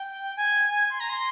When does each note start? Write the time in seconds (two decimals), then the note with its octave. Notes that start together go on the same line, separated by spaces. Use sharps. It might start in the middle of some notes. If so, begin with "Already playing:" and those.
Already playing: G5
0.37 G#5
0.90 C6
1.00 A#5
1.09 C6